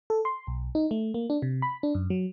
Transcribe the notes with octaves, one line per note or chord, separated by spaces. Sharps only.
A4
C6
B1
D#4
A3
A#3
D4
C3
B5
D4
F#2
F#3